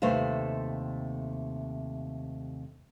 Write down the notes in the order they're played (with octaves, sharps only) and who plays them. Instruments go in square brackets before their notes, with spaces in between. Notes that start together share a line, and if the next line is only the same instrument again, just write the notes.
[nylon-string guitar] D#2 C3 A3 B4 C5 F5